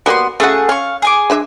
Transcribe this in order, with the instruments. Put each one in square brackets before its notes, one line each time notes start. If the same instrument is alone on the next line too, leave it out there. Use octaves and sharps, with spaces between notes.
[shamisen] F#3 G3 A#3 [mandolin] B3 C6
[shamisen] C#3 F#4 [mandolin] A3 G#4 F#5
[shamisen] C#4 [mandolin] F5 C#6
[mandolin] G#4 G#5 D6
[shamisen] G#3 D4 E5